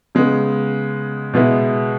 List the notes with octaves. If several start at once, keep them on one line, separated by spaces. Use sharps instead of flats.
C#3 G#3 B3
B2 G#3 B3 E4